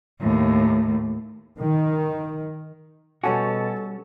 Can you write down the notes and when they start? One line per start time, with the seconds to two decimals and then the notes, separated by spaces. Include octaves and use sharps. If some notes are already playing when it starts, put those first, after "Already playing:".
0.20 D#2 A2
1.57 D#3
3.24 B2 G3 C#4 F#4 A4 G#5 A5 C#6